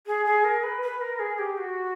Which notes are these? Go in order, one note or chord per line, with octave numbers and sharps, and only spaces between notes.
G#4
G#4
A#4
B4
B4
A#4
G#4
G4
F#4